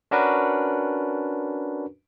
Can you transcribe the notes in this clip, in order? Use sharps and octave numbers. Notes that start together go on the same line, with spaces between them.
C#4 D4 F#4 A#4 B4